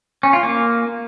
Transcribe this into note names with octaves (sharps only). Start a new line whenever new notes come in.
C#4
F4
A#3